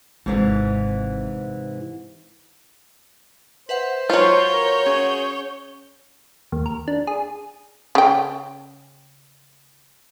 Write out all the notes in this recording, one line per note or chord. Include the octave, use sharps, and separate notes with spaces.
G#1 G#2 C3 E3
B4 C5 E5 F#5
F#3 F4 B4 C#5 G6
A#4
C#4 G#4 F#5
D#2
A#4
D4
G#4
C#3 G5